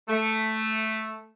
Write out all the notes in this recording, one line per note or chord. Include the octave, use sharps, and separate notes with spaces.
A3